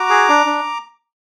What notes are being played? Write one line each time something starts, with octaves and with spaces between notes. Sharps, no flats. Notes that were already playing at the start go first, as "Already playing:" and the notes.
Already playing: F#4 A#5 D6
G#4
D4
D4